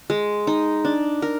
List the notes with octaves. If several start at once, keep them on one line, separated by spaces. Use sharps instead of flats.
G#3
D#4
D4
A#4